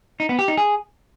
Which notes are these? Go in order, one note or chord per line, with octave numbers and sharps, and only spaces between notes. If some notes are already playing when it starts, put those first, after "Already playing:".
D#4
B3
G4
D#4
G#4